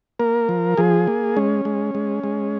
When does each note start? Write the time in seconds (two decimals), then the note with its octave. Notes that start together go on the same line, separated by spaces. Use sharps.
0.19 A#3 A#4
0.49 F3
0.77 F3 G#4
1.07 A#3
1.37 G#3 C#4
1.65 G#3
1.95 G#3
2.24 G#3